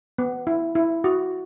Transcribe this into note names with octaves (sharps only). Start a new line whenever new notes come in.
B3
E4
E4
F#4